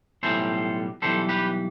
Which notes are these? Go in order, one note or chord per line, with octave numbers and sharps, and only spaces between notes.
B1 A2 E3 G3 A4 C5
B1 A2 E3 G3 A4 C5
G4 B4